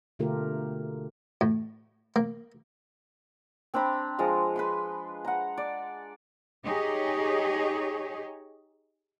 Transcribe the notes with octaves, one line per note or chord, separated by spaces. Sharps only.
B2 D3 A3 F4 G4 A#4
A2
A#3
C4 D4 A#5 B5
F3 G#3 D4 A#5
B4 B5 C6
F#5 A#5
D5
D#4 G4 G#4 C#5 D#5